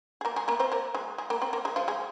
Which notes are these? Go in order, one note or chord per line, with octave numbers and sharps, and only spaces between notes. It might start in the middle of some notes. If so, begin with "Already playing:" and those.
G#4
A#3 A#4
G#3 G#4
A#3 A#4
C4 C5
A#3 A#4
G#3 G#4
G#3 G#4
A#3 A#4
C4 C5
A#3 A#4
G#3 G#4
F3 F4
G#3 G#4